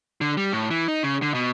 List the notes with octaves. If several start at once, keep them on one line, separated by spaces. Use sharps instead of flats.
D3
G3
A2
E3
D#4
C#3
D3
B2